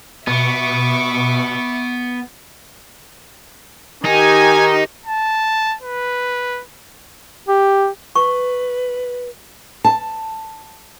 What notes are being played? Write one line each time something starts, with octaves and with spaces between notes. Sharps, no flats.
B2 B3 E5 C#6 D6
D#3 D#4 G4 G#5
A5
B4
G4
B4 C#6
A5